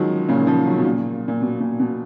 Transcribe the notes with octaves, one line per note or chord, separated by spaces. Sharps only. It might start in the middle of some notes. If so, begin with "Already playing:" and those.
Already playing: D#3 F3 F#3 G#3
A#2 C#3
D#3
C#3 F3
D#3 F#3
B2
A#2
A#2
B2
A#2
B2